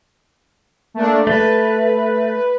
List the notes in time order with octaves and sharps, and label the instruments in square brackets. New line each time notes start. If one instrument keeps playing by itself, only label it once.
[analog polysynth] A3 A#3 D4
[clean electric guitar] A3 [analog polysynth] B4